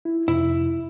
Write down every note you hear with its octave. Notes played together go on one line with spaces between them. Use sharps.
E4
F2 C3 E4